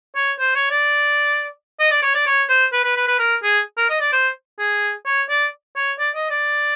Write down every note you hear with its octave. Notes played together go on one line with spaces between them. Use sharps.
C#5
C5
C#5
D5
D#5
D5
C#5
D5
C#5
C5
B4
B4
B4
B4
A#4
G#4
A#4
D#5
D5
C5
G#4
C#5
D5
C#5
D5
D#5
D5